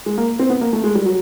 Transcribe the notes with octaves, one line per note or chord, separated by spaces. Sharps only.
G#3
A#3
C4
B3
A#3
A3
G#3
G3
F#3